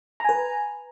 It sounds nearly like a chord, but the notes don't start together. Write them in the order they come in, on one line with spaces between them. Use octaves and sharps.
A#5 G#5 B4